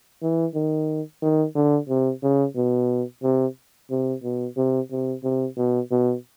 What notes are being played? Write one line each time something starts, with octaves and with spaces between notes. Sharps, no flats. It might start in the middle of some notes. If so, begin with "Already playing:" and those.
E3
D#3
D#3
D3
C3
C#3
B2
C3
C3
B2
C3
C3
C3
B2
B2